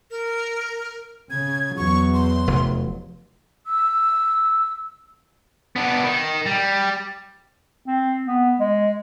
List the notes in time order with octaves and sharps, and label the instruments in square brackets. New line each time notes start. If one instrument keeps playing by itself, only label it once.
[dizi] A#4
[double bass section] C#3 [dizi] G#6
[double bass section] E2 F#3 [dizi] C#6
[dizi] C6
[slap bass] F1
[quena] E6
[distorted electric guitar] B3 D4
D#3
G3
[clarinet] C4
B3
G#3